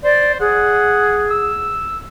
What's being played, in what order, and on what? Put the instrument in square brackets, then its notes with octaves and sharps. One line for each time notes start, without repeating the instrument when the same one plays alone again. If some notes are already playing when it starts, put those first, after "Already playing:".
[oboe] C5 [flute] D5
[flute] G#4 [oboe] F#5
[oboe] E6